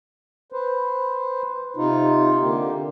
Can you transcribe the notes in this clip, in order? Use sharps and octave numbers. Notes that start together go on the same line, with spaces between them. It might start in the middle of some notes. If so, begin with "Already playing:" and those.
B4 C5
C3 D#4 F4
D3 A#3 G4